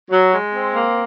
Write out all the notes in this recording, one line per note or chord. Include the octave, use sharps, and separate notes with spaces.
F#3
G#3
C4
A#3